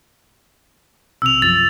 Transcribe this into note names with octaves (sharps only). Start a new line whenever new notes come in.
B1 C3 E6 F7
F#2 F3 A6 F7